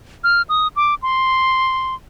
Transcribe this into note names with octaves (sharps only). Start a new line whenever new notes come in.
F6
D#6
D6
C6